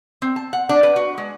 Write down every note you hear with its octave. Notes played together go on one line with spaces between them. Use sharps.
C4
A5
F#5
D4
B4
F#4
G#3